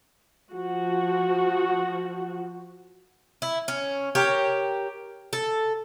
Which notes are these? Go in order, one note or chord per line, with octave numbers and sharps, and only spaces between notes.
F3 F#4
E4
C#4
G4 A#4 C#5
A4